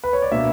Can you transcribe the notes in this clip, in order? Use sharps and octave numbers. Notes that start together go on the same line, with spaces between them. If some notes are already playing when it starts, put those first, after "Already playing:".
B4
C#5
D5
B2 A#3 D4 E5